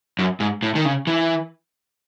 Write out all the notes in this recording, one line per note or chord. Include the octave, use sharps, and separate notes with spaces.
F#2
G#2
A2
D#3
C#3
E3